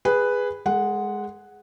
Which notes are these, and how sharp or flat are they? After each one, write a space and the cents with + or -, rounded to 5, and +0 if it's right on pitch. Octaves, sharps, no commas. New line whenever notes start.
G#4 -10 B4 +0
G#3 +0 A4 +45 F#5 +0